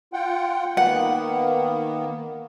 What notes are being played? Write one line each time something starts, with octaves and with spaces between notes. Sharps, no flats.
F4 F#5 G5
D#3 A#3 B3 F#5